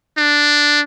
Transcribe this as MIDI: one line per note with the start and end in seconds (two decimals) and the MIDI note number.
0.18 0.81 62